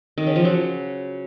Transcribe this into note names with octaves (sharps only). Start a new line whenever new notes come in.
D#3
C#3
F3
F#3